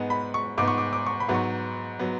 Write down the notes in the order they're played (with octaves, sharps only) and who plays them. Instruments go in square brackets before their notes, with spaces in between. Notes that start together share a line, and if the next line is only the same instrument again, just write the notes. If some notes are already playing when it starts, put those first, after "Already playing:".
Already playing: [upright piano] G#2 G#3 B3
[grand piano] B5
C#6
[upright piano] G#2 G#3 B3 [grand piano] D6
[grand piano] C#6
D6
D6
C#6
B5
[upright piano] G#2 F#3 B3
[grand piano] C#6
[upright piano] F#3 B3